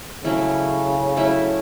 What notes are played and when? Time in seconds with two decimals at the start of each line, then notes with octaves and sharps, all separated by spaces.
0.24 C#3 F#3 A3 C#4 E4
1.16 F#3 A3 C#4 E4